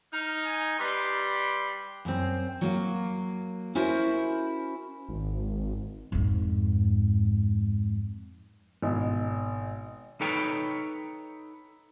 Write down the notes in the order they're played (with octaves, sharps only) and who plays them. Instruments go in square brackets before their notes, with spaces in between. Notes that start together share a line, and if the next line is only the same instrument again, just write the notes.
[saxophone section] D#4 [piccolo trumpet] F6
[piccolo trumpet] G#5
[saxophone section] G3 B4 [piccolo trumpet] C6
[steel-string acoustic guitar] F#2 C4
F#3 A#3
C#4 E4 F#4 A#4 C5
[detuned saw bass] G#1
[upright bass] F2 G#2
[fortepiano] G#1 B2
[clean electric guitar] D#4 A4 B4 C#5 G5 A#5